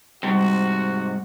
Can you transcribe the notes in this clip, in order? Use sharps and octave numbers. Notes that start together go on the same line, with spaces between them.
G#2 C3 G3 F#4